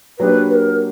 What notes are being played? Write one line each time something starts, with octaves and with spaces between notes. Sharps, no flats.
F#3 A#3 D4 G4 B4
B4
A#4